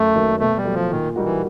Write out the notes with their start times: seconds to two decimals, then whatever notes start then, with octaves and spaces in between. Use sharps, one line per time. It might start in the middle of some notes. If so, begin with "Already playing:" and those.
Already playing: F#2 A3
0.15 D#3 F#3 A#3
0.40 B2 A3
0.57 G3
0.65 F#3 A3
0.74 F3
0.91 A#2 D#3
1.16 G3 A#3 D#4 F#4
1.24 E3